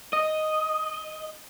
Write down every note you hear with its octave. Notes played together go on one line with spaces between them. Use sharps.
D#5